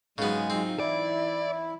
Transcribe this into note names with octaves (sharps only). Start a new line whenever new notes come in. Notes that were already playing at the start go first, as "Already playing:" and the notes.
G#2 C#3 F#3 G#3 B3 G#4
F#3 C4 D#4 F4
E3 E4 D5